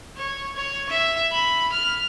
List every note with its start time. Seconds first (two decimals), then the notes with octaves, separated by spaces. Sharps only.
0.17 C#5
0.56 C#5
0.89 E5
1.32 B5
1.72 F6